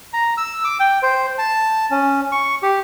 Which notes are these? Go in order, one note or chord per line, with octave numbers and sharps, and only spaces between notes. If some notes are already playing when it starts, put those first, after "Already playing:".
A#5
E6
D6
G5
C5
A5
C#4
C#6
G4